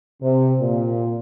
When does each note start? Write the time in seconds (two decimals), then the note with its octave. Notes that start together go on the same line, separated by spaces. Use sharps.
0.22 C3
0.60 A#2